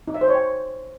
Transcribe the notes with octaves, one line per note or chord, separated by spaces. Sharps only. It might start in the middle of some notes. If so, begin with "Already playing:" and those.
D#4
E5
C5
C#5
G5